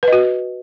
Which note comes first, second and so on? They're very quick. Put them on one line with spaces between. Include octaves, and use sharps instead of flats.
B4 D#5 F#4